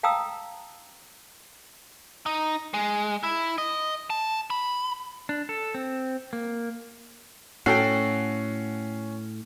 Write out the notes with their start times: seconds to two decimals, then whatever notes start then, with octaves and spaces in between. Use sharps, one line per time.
0.03 F5 G5 A5 A#5 D#6 E6
2.26 D#4
2.74 G#3
3.23 E4
3.58 D#5
4.10 A5
4.50 B5
5.29 D4
5.49 A4
5.75 C4
6.33 A#3
7.66 A2 C#4 F#4 A4 G5 C7